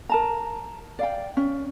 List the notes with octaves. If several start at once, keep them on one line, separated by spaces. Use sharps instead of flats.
A#4 A5 A#5
D5 F5 G5
C#4